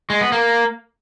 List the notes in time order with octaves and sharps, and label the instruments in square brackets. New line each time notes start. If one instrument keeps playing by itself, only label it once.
[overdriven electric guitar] G#3
B3
A#3